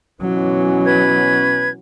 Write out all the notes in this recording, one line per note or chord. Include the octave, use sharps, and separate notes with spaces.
B2 E3 F#3 C#4
B4 G#6